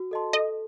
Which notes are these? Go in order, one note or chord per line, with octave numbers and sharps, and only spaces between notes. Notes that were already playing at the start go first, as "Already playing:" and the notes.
Already playing: F#4
A4 D#5 A5 C6
A4 D#5